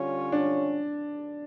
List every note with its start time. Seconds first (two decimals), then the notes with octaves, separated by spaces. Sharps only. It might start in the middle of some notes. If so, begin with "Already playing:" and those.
Already playing: D3 G3 C#4 F4 C#5
0.32 D4